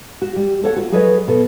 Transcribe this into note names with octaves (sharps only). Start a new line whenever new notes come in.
F#4
G3
A4 C#5 F#5
F4 F#4
F#3 G#4 A4 B4 C#5 D#5
B2 A4